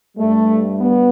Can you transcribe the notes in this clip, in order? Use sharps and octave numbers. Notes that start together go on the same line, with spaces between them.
G2 G3 A3
B3